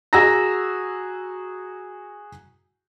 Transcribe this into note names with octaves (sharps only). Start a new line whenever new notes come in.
F#4 G#4 A#5 E6 A#6